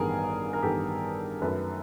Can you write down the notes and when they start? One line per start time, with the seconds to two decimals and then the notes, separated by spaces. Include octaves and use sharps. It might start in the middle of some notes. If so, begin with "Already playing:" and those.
Already playing: A1 G2 D#3 G3 B3 G#4 A#4
0.53 A#4
0.62 A1 G2 D#3 G3 B3 G4 A4
1.42 F#2 D#3 F#3 A3 A4 B4